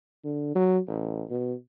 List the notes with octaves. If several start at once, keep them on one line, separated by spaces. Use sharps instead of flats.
D3
F#3
A1
B2